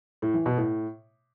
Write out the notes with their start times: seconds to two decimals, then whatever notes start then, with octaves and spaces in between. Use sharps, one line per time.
0.22 A2
0.34 E3
0.46 B2
0.57 A2